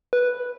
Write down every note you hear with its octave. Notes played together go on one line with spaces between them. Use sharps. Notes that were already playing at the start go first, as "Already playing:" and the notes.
B4